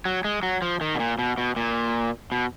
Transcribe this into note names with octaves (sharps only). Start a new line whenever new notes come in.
F#3
G#3
F#3
F3
D#3
B2
A#2
B2
B2
A#2
B2